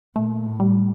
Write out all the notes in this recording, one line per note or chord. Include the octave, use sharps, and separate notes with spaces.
A#2 A3
A2
G3